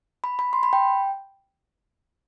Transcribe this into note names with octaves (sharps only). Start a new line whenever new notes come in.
B5
B5
C6
B5
G5